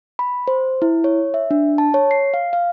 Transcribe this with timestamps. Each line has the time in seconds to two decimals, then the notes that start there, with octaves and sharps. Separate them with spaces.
0.19 B5
0.48 C5
0.82 E4
1.04 C#5
1.34 E5
1.51 D4
1.78 A5
1.94 C#5
2.11 C7
2.34 F5
2.53 F5